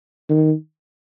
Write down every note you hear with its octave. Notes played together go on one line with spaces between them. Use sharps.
D#3